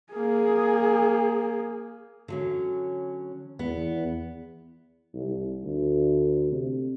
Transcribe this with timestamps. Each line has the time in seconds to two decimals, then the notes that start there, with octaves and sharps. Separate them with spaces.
0.13 A#3 G#4
2.28 D3 F#3 C#4
3.59 E2 B3
5.14 C2
5.64 D2
6.52 C3